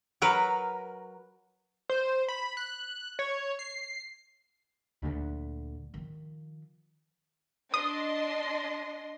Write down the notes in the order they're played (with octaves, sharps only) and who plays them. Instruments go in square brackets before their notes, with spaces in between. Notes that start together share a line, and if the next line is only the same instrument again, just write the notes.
[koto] F#3 A#4 B4
[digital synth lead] C5
B5
F#6
C#5
C7
[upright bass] D2 A#2
D#3 F3
[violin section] D4 D#5 C6 [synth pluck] D#6